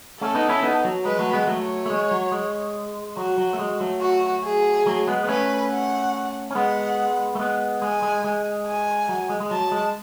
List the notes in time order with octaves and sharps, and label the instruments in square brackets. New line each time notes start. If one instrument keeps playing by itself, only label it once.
[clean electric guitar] A3 C#4 [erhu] A4
[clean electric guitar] B3 D#4
C#4 E4
B3 D#4
F#3
[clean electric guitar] G#3 [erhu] B4
[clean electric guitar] F#3 A3
G#3 B3
[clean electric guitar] F#3 A3 [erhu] C#5
[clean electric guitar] A3
G#3
F#3
G#3
[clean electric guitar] F#3 [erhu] F#4
[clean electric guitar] F#3
A3
G#3
F#3 A3
[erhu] F#4
G#4
[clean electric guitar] F#3 A3
G#3 B3
B3
[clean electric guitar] A3 C#4 [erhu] B4
[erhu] F#5
[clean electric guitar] C#4
[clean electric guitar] G#3 B3 [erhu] F#5
[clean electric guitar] A3
G#3 B3
[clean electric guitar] G#3 [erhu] G#5
[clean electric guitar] G#3
G#3
[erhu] G#5
[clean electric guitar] F#3
G#3
G#3
[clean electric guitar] F#3 [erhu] A5
[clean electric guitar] G#3